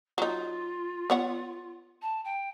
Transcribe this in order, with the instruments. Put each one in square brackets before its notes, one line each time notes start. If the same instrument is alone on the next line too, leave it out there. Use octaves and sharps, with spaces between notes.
[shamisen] F#3 D#4 [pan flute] F4
[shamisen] B3 C#5 F#5
[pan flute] A5
G5